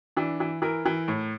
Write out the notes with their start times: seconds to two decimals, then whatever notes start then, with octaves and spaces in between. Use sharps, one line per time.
0.16 E3 D4
0.40 E3
0.62 E3 A#4
0.85 E3
1.08 A2